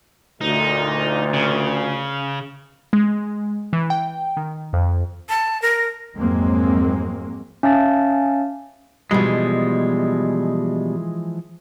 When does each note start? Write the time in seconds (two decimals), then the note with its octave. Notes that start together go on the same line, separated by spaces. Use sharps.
0.41 D2 A#2 D#4
1.34 C#3
2.93 G#3
3.73 E3
3.90 G5
4.37 D#3
4.73 F2
5.29 A5
5.62 A#4
6.16 F2 G#2 F#3 G#3 A#3 C4
7.63 C#4 E5 F5 G#5 A5 A6
9.11 B2 E3 F3 G3 G#3